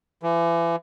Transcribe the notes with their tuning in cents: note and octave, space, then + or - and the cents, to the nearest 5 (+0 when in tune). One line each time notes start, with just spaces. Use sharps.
E3 +35